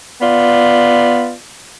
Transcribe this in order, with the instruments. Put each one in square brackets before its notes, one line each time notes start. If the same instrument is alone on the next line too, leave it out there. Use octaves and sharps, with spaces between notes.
[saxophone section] B3 F4 D5